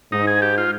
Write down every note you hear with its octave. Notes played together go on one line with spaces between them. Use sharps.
G#2 D#4
G#4
G4
F4